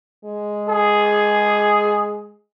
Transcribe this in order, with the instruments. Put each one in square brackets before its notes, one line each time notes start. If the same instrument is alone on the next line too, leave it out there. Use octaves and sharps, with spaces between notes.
[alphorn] G#3
[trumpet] G#4